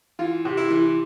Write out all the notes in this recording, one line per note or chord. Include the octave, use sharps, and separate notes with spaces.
E3 F4
C3
E4
E3